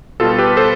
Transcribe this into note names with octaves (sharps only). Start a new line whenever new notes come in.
B2 G3 F4 A4
G4 B4
A4 C5